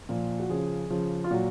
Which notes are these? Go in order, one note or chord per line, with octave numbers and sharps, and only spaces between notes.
A#2 F3
F#4
C#3 F3 G#4
C#3 F3
F4
A#2 F#3 F#4